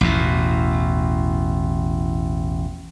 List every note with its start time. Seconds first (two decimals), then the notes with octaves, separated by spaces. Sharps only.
0.01 A1 E2 B2